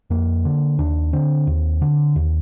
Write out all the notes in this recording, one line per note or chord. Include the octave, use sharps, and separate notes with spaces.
F2 A#3
D3
D#2 D4
D3 C4
D#2
D3
D#2